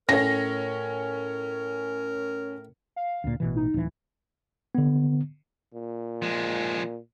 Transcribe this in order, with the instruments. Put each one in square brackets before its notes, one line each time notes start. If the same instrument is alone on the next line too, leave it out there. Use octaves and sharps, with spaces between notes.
[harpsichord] A2 [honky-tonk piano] C#4 C#5 [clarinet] A#4 [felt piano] A#6
[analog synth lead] F5
[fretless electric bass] D2 A#2
A1 B2 E3
[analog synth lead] D#4
[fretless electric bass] D1 E3
[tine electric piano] D3 B3
[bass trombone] A#2
[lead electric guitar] F3 G#3